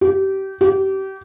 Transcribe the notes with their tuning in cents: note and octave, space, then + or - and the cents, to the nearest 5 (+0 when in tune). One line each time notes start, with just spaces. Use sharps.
G4 -25
G4 -30